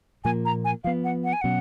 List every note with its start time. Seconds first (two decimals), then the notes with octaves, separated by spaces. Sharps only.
0.24 A#2 F3 A#3 G#5
0.45 A#5
0.65 G#5
0.84 F3 B3 F5
1.04 F#5
1.24 F#5
1.33 G#5
1.41 B2 F#3 C#4 F#5